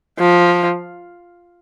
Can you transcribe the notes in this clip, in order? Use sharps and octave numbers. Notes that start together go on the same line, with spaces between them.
F3